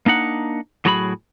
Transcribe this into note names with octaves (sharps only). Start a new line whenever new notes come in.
A#3 D4 D#4 F#5
A2 F#3 F#4 G#4 A#5 B5